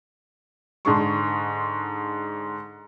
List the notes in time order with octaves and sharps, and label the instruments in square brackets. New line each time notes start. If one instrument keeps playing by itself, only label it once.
[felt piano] G#2 D3 D4 G#4 C6 C#6